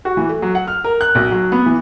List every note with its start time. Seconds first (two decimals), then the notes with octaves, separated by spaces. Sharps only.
0.05 F#4
0.17 E3
0.29 A3
0.42 F#3
0.55 F#5
0.68 F6
0.84 A#4
1.01 F#6
1.15 B1
1.31 F#3
1.52 B3
1.66 E3